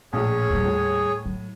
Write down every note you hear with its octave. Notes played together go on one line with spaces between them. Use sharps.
A#1 A2 G#4 C#5
D#2 G3
A2
F#3